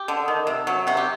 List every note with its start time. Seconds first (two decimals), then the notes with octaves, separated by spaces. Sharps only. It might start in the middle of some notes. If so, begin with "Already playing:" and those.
Already playing: G4
0.08 D3
0.28 D#3
0.47 C3
0.67 F#3
0.87 C3 F#4
0.97 G4